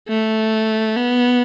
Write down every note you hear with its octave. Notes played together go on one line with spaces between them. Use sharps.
A3
B3